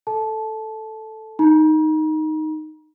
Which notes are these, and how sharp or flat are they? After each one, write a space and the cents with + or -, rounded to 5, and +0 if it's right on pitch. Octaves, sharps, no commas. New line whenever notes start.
A4 +0 A5 -20
D#4 +0 A#5 +40